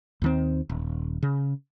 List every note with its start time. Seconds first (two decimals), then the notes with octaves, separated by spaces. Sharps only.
0.22 D#2 D#3 C4
0.69 D#1
1.23 C#3